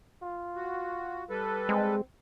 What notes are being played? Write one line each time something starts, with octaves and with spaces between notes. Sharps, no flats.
F4
F#4
G3 A4 B4
G#3 C4